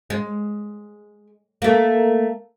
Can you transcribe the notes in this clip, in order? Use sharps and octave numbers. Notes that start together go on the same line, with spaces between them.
G#3
A3 A#3